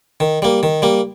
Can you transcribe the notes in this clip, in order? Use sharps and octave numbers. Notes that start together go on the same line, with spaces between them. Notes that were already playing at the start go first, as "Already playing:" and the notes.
D#3
G3 A#3
D#3
G3 A#3